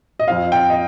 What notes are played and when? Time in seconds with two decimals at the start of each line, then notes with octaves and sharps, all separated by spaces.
0.19 D#5
0.28 F2 F3 C4 F5
0.52 G5
0.70 D#5